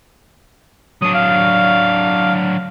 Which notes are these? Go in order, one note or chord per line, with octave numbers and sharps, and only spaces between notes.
F#3 D4 D#6
F5